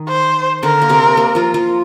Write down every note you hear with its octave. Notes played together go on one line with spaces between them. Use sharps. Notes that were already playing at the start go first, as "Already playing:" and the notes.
Already playing: D#3 D#4
C5
D3 D4 A#4
A#3
C3 C4
A#3
F3 F4
F3 F4